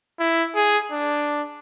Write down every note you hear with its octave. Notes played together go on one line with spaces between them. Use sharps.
E4
G#4
D4